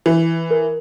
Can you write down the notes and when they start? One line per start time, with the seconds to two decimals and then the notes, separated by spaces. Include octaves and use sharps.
0.06 E3
0.51 A#4